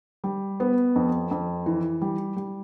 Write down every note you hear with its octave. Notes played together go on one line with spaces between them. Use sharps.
G3
B3
F2
F2
E3
G3
G3